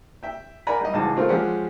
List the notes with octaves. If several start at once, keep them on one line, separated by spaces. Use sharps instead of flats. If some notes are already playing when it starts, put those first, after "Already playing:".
E5 G5
A#4 D5 F#5 G#5 A#5 B5
G3 D#5
C#2 G#2 E3 A5
G#3 A3 C4 F4 A#4
F3 G#3 C#4 G4 F#5